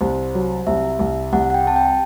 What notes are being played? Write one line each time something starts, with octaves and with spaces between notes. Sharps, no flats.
C2 C5
F#3
C2 E5
C2
C2 F#5
F#5
G5
C3 A5
G5